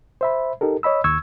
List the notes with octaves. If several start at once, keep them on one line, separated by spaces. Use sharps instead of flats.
C5 E5 B5
D#4 G4 A4 A#4
C#5 D#5 B5 E6
D#2 C#6 E6 G#6